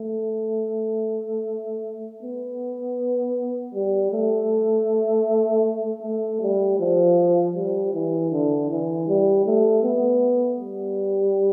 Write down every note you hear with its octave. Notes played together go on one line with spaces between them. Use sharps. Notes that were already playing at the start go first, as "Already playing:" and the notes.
Already playing: A3
B3
G3
A3
A3
G3
F3
G3
E3
D3
E3
G3
A3
B3
G3